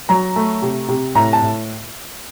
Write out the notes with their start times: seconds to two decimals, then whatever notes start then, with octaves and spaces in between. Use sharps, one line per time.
0.09 F#3 A#5
0.36 A3
0.62 C3
0.89 C3
1.15 A2 A#5
1.33 A5
1.42 A2